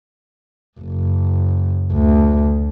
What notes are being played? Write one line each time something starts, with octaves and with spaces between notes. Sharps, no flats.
F#1
D2